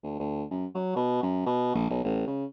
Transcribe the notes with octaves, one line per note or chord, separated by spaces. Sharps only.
D2
D2
F#2
F#3
B2
F#2
B2
A#1
B1
A1
C#3